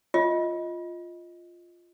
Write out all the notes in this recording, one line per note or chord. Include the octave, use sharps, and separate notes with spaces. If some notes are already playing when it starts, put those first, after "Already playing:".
F4 D#5